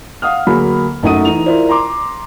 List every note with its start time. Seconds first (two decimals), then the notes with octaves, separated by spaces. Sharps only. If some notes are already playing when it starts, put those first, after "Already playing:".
0.22 F5 F#5 D#6 F6
0.47 D2 F#3 A#3 G#4 B5
1.03 F#2 A3 D#4 F#5 D#6 D#7
1.25 E3 D#4 F7
1.46 E4 F4 A#4 C5 D5
1.69 A#5 C6 D6